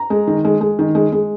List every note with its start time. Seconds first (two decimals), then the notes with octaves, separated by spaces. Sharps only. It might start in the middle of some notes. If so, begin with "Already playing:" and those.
Already playing: A#5
0.10 G#3
0.27 D#3
0.44 G#3
0.61 G#3
0.79 D#3
0.95 G#3
1.12 G#3